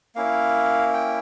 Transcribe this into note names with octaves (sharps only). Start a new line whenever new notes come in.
A#3 C#4 E4 F5
G5